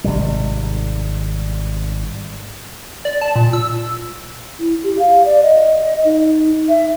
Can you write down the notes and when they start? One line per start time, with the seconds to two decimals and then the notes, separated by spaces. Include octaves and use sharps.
0.04 G#1 C3 G3
3.05 D5
3.22 A5
3.36 A#2
3.53 E6
4.60 E4
4.83 G4
4.99 F5
5.26 D5
5.43 D#5
6.05 D#4
6.69 E5